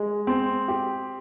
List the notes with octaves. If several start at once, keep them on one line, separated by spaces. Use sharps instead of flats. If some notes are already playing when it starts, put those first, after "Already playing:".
Already playing: G#3
C4
G4